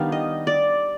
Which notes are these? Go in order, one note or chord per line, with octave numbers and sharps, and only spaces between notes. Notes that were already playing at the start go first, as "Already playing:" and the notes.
Already playing: D#3 G3 B3 D4 F5
D#5
D5